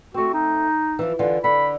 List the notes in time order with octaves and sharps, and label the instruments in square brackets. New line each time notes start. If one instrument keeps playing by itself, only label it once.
[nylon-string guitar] A3 C4 [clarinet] F#4
[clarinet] D#4
[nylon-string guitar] E3 F3
D3 E3 F4
[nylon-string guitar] D3 [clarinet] B5